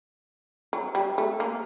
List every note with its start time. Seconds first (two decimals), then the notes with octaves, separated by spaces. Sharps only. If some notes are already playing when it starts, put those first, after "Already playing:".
0.73 F#3
0.95 G3
1.18 A3
1.40 A#3